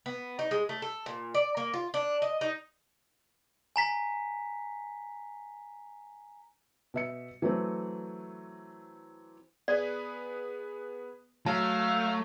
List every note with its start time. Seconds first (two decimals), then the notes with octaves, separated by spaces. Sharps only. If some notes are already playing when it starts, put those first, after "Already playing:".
0.06 B3
0.39 D#4
0.51 G#3
0.69 A3
0.82 A4
1.06 A#2
1.34 D5
1.57 A#3
1.74 F4
1.94 D4
2.22 D#5
2.41 D#4
3.76 G#5 A#5 B6
6.94 B2 E5 C#7
7.42 E3 F#3 A3 C4
9.68 B3 G#4 B4 D5
11.46 F#3 A3 F5 A5